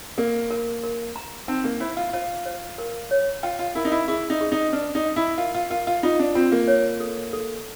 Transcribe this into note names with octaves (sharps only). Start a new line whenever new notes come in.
A#3 A#4
A#4
A#4
A#5
C4 D#4
A#3
E4 C5
F4
F4 C5
C5
A#4
C#5
F4 G5
F4
E4 A#4
D#4
E4
E4 G#4
D#4
G#4
D#4
D4 B4
D#4
D#5
E4
F4 A#4
F4
F4 A#4
F4
D#4 F4
D4
C4 F4
A#3
C#5
A4
A4